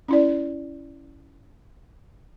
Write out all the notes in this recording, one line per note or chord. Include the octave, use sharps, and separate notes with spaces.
C#4 E4 D5